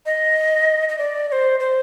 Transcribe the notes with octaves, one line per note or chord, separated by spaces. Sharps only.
D#5
D#5
D5
D5
C5
C5